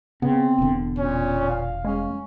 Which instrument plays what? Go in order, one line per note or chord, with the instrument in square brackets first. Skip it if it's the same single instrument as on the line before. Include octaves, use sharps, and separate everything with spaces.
[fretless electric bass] C#3 [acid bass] B3 [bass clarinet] C4
[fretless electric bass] E1 D3
[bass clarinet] A#2 [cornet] C#4
[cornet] F5
[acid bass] G#3 [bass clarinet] C#4